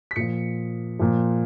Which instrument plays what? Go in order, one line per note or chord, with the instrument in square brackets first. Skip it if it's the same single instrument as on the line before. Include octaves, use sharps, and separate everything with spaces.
[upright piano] B6
A#2 F3 C#7
A#2 F3